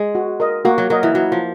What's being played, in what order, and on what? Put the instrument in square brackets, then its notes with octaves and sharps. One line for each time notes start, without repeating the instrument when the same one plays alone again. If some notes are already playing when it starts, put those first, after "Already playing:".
Already playing: [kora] G#3
[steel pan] F#4
A#4 D#5
[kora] A#3 [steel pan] F#4
[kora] F#3
[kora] F#3 [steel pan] A#4 D#5
[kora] E3
[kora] F#3 [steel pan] E4
[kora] F3